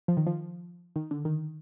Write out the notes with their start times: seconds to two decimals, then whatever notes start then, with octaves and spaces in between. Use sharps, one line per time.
0.08 F3
0.17 D#3
0.27 F3
0.96 D#3
1.11 D3
1.25 D#3